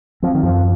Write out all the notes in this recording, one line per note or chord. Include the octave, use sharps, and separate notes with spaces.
F3 C4
D#3
F#2 F3